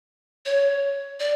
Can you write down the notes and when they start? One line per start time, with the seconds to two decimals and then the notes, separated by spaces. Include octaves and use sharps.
0.46 C#5
1.20 D5